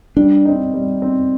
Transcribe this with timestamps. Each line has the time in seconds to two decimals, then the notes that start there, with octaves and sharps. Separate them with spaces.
0.17 G3 D4
0.45 C4 D#4
0.74 G3
1.02 C4 D#4